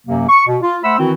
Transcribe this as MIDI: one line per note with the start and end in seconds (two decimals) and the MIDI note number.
0.07 0.24 42
0.07 0.24 48
0.07 0.24 54
0.07 0.24 58
0.29 0.44 85
0.47 0.57 47
0.62 0.77 65
0.84 0.99 57
0.84 0.99 72
0.84 0.99 76
0.84 0.99 78
0.84 0.99 83
0.84 0.99 88
0.99 1.12 51
0.99 1.12 52
0.99 1.12 60
0.99 1.12 64
0.99 1.12 66